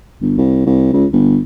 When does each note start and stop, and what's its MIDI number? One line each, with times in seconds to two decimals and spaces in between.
0.21 0.33 31
0.38 0.63 36
0.66 0.89 36
0.93 1.06 37
1.13 1.39 31